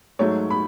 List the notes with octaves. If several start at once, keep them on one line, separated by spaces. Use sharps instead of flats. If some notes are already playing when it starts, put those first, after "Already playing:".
G#2 F#3 A3 C#5
B5